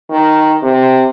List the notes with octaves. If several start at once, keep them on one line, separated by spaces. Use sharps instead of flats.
D#3
C3